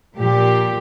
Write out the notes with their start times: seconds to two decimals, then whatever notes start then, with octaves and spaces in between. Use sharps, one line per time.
0.16 A#2 F3 G4